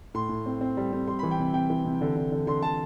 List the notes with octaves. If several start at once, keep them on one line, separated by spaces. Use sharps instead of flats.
A2 C6
A2
C4
C4
G3
C4
G3 C6
B5
E3
G5
C3
C3 G5
E3
C3
D3
D3
D3
D3 C6
D3 A5